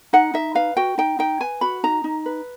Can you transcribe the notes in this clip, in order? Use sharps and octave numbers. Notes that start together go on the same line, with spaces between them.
D#4 F#5
D#4 E5
B4 F5
F#4 G5
D#4 G5
D#4 G5
B4 G#5
F#4 B5
D#4 A#5
D#4
B4